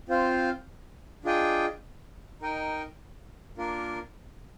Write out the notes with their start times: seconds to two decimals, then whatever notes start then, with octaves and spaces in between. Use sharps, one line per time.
0.09 C4 F4 C5 F5
1.25 D4 F4 G#4 D#5 G5
2.41 D#4 A#4 D#5 G5
3.57 A#3 D4 F4 A#4